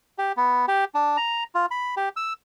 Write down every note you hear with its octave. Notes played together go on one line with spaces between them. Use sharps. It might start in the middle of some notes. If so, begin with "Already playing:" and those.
G4
B3
G4
D4
A#5
F4
B5
G4
E6